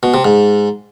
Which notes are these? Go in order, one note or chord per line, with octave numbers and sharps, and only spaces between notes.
B2
C3
G#2